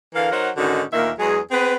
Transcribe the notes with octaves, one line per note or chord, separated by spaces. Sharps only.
D3 E3 A#4 F5
F#3 D#4 A#4 C5 F#5
G#2 D3 D#3 C#4 D#4 F#4
D2 A#2 D#3 A#3 A#4 E5
E2 F#3 G#3 G#4
B3 C4 G#4 B4